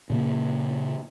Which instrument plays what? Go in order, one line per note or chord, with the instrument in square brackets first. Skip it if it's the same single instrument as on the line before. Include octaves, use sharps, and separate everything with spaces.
[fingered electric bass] A#2 C#3 A#3